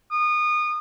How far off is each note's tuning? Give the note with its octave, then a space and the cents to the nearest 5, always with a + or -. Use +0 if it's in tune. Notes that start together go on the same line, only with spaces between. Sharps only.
D#6 -30